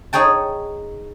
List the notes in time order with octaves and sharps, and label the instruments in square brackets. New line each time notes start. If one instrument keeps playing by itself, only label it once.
[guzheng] D#4 G#4 C#5 G5 A5